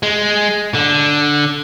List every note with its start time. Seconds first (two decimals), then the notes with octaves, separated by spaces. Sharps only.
0.03 G#3
0.74 D3